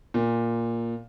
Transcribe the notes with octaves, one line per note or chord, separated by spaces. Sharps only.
A#2